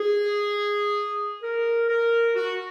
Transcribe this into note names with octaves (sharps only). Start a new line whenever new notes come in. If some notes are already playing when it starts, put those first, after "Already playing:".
Already playing: G#4
A#4
A#4
F#4